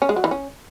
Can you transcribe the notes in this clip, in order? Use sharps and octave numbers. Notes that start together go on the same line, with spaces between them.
C#4
G#3
F#3
E3
C#4